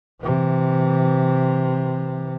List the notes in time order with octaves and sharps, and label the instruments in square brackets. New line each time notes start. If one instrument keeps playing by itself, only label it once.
[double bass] C3 E3